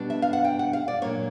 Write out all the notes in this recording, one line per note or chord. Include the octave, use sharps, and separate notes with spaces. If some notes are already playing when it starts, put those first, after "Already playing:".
Already playing: B2 G3 B3 D4
E5
F5
F#5
G5
F#5
F5
D5
A#2 F#3 A#3 D4 C#5